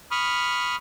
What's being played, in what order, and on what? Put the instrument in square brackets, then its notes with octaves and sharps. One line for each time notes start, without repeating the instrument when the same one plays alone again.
[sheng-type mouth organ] B5 C#6 D#6 F6